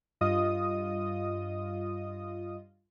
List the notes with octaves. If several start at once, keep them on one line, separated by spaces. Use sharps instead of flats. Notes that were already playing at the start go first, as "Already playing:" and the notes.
G2 F4 D#5 D#6